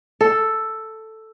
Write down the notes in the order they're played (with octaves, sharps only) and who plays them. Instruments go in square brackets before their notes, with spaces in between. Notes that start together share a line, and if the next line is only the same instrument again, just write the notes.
[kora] A4